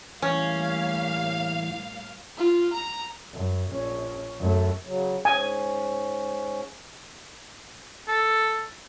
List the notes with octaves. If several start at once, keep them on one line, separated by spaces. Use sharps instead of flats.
A2 E3 G3 A#3 C#4 F5
F4
A#5
F#2
A#1 C#4
F#2 A3
C#3 F#3
G#2 C#4 G#5
A4